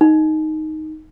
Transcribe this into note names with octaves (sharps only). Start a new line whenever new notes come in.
D#4